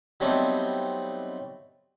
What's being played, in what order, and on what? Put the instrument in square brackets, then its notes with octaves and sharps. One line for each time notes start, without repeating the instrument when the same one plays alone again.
[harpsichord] F#3 G3 A3 B3 C4 D#4